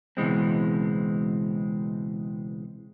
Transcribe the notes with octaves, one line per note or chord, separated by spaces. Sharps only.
C#2 B2 E3 G#3 C4